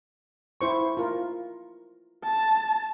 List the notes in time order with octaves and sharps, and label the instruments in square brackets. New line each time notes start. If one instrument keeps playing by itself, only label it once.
[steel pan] E4 C5 C#6
F4 A#4
[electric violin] A5